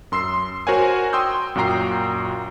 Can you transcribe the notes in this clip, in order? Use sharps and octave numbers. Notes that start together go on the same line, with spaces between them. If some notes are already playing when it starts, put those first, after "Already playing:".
F#2 C6 E6 C7
F#4 A#4 C5 C#5 F#5 G#5
G5 C6 D#6 E6 G6
F#2 A#2 F#4 G5 A#5 C7